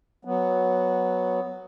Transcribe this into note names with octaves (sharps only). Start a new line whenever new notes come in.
F#3 B3